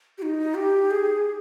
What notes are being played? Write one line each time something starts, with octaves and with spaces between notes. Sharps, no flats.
G4
D#4
G4
G#4